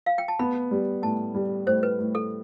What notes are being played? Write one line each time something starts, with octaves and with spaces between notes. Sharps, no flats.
F5
G5
A5
B3 B5
G3
A2 A5
G3
A2 C5
B4
A2
A4